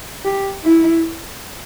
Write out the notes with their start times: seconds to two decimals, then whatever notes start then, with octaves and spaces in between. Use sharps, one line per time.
0.25 G4
0.64 E4